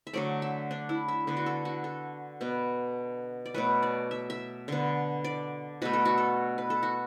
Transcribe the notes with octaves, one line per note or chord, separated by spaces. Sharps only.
E5
D3 F#3 A3 D5
E5
D4
E4
E5
D3 B3
F#4
A4
F#4
A4
B2 B3
D5
B2 F#3 A3 B4
D5
E5
E5
D3 B3
D5
B2 A3 B4
A4
F#4
A4
B4
A4
F#4